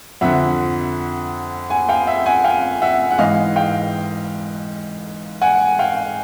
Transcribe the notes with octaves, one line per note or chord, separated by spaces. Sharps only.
F2 D3 E5 F#5
F#5 G#5
F5 G5
E5 F#5
F#5 G#5
F5 G5
E5 F#5
F#5
G#2 E3 D#5 F5
F5 G5
F#5 G#5
F5 G5